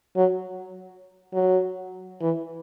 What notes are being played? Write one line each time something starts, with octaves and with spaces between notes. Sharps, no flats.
F#3
F#3
E3